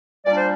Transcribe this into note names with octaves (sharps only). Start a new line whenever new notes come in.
A#2 G3 D4 D5
C5